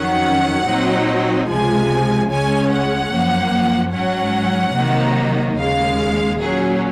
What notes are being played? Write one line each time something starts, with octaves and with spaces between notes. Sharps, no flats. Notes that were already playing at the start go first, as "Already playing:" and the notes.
Already playing: F2 D#3 F#3 C#4 F#5
A#2 F#3 C4 D#4
C#2 C3 F3 G#3 G#5
C#2 C#3 G#3 C#4 G#5
F#5
F#2 F3 A#3
G#2 F#3 C#4 F#5
C3 D#3 F#3 A#3 D#4
D#2 C#3 G#3 F5
A#2 F#3 C#4 G#4